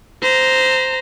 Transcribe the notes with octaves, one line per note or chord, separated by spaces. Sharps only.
C5 A#5